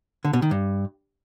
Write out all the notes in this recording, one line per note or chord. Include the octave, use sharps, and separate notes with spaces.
D3
B2
D#3
G2